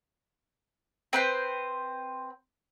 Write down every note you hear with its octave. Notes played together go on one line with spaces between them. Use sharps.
C4 B4 C5